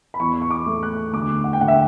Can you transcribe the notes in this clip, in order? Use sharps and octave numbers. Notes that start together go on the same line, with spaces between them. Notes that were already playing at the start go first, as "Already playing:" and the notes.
B5
E2 C#6
C#6
D6
A3
F#6
D2 D6
F#5
G5
D2 F#5
E5